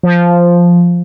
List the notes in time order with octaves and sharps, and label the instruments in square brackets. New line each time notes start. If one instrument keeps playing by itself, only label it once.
[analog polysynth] F3